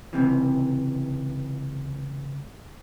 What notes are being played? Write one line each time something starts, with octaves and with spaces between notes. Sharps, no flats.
C#2 G2 C3 E3